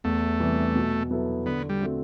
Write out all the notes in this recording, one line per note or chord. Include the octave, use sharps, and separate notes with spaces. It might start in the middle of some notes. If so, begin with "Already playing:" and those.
E2 A3
C3 E3 G3
B2
F#3 B3 E4 A4
D3 B3
G3
A3 C4 F#4 A4